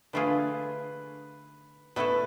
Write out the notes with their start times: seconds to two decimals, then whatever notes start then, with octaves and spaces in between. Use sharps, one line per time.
0.13 D3 A3 D4 F4 G#4 B4
1.96 B2 A3 E4 A4 B4